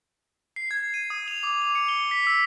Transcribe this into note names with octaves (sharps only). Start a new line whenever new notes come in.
C7
G#6
D#7
D#6
F7
D6
F7
C#7
G7
B6
E6